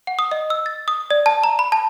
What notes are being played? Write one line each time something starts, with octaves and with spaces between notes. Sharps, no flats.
F#5
D#6
D#5
E6
A6
D#6
D5
A5
A#5
B5
A5